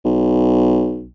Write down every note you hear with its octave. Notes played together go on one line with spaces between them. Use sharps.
B1